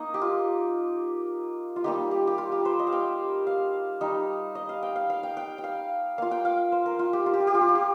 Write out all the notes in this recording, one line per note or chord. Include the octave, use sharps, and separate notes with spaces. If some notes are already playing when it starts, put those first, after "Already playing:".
Already playing: A#3 D#4 D#5
G4
F4
F4
G3 A#3 D#4 G4
G4
G4
F4
G4
C5
D#5
F5
G5
F5
G3 D#4
D#5
F5
G5
F5
F5
G5
G5
G5
F5
A#3 F4 F5
G5
F5
C5
A#4
F4
G4
F4
G4
F4
G4
F4
G4
F4
G4